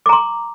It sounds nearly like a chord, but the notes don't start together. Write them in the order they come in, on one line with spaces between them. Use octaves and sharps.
D6 A#5 C6